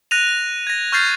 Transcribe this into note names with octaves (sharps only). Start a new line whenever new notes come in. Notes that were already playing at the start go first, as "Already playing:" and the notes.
F#6 A#6 D#7 F7
G#6 A#6
C#6 F6 G6 A6 C7